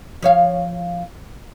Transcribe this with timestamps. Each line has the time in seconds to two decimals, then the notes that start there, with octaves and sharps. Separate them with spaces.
0.22 F3 C#5 F5